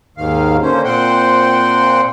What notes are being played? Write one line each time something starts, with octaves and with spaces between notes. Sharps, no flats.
D#2 G#2 D#3 F5
D3 A#3 C#4 C5
A#2 C4 C5 F#5 G5 C6